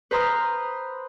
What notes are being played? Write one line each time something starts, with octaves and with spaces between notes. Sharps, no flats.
B4 C5 A#5 C6 D#6 F6